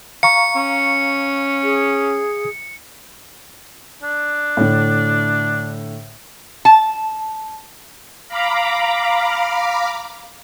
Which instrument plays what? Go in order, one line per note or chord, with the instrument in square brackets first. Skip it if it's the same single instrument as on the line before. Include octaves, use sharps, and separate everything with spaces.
[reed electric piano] F5 A#5 C#6 [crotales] C#7
[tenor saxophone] C#4
[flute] G#4
[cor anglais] D4
[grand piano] A2 D3
[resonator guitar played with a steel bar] A5
[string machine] F5 A#5 B5 D6